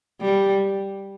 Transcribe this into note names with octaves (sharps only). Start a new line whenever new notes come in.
G3